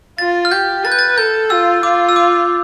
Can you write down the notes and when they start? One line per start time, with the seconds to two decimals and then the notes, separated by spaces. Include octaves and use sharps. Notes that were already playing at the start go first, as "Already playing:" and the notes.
0.18 F4 A6
0.45 F6
0.51 G4 G6
0.84 B4 A6
0.92 G6
0.99 A6
1.18 A4 G6
1.50 F4 E6
1.83 F4 D6
2.09 E6
2.16 D6